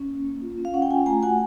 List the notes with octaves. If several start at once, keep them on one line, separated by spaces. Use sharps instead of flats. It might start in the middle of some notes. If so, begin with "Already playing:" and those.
Already playing: C#4
A#3
A#3
F4
C#4
F5
C#4 F#5
G5
F4 F#5 G#5
A3 G#5 A#5
F#4 F#5 G#5